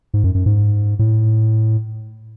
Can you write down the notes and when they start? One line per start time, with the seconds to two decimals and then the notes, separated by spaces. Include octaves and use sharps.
0.14 G#2
0.24 F#2
0.35 F#2
0.46 G#2
0.99 A2